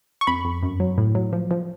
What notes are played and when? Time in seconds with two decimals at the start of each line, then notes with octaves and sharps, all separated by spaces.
0.21 C#6
0.27 F2 B5
0.45 F2
0.63 F#2
0.80 F#3
0.98 A2
1.15 F#3
1.33 F3
1.51 F3